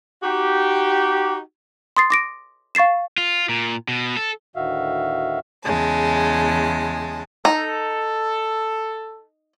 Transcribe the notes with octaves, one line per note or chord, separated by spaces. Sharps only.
D#4 F#4 G4
C6 D#6 A6 C7
D6 A#6 D7
F5 C#6 A6 C7 E7
F4
A#2
B2
A4
D2 A2 D#3 F#4 E5 F5
E2 C#3 G#3 A5
D#4 A4